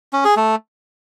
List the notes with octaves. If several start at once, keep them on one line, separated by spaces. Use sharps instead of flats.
C#4
G#4
A3